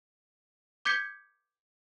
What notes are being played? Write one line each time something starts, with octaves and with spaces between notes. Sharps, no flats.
D6 G6 G#6 B6 C#7 G7